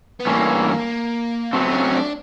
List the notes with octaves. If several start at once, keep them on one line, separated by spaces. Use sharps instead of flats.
B3
G2 E3 A3 A#3 C#4
F#3 A3 B3 C4
C#4
D4